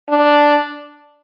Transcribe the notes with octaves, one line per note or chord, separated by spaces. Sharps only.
D4